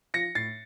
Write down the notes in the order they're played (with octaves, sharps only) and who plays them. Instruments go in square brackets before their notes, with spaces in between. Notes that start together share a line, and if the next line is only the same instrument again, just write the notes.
[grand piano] F3 A#6 C#7
A2 A6 C7